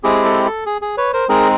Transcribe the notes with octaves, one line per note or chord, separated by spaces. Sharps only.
G#3 C4 E4 G4 G#4
A4
A4
G#4
G#4
B4 C#5
A#4 C5
G#3 C4 D#4 G#4 A#4